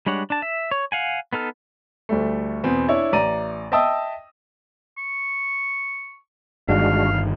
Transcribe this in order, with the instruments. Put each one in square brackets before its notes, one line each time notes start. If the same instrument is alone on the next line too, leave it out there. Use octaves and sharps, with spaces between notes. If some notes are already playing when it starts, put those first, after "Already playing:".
[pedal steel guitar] G3 G#3 D4 C#5 F#5
D4 A5
E5
C#5
F5 F#5 G#5
B3 D#4 A4 F6
[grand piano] D2 G3 A3
E2 B2 B3 C4
D4 E4 C#5
A1 D5 A#5 D#7
D#5 E5 G5 A5 D#6 E6
[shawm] C#6
[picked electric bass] G1 G2 D#3 [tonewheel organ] G#3 D4 F#4 [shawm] F5